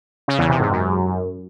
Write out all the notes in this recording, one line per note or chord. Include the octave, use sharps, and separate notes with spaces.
C#3
E2
C3
G#2
F#2